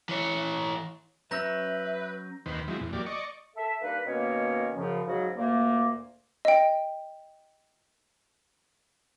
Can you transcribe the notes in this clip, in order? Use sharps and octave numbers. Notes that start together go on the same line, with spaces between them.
E3 C#5
F#3 C#4 B4 E5 A#5 E6 G6 A#6
D#2 D#3 B4 C5
F3 F#3 G#3 C4 E4
E2 A2
F#3 A#3 G4 D5
D5 D#5 C#6
A4 E5
G2 A#3 D#4 B4
B2 D#3 A#3 B3 C#4 C#5
F#2 C#3 F3
G#2 C#3 F#3 F#4
D2 A#2 A3 A#3
D#5 G5